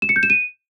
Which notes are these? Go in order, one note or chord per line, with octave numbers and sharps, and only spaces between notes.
E7
C#7
G6
E7
D#7